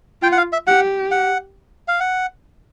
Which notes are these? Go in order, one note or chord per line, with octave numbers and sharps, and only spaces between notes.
F4 G5
F#5
F5
E5
G4 F#5
F#5
F5
F#5